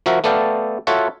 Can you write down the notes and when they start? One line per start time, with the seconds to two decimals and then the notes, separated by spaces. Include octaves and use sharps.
0.06 F3 F#4 A#4 E5
0.24 A3 B3 A4 D5 F5 G5
0.87 F4 F#4 A4 C#5 E5 F#5